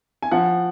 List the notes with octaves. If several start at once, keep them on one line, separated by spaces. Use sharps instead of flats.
G#5
F3 F#5